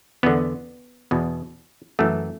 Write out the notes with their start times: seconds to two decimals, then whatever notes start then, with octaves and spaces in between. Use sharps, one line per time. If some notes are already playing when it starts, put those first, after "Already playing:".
0.23 E2 D3 B3
1.11 E2 B2
1.99 F#2 E3 A3